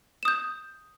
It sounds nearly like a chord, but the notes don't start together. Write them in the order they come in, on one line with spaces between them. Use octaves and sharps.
E7 D#6 G6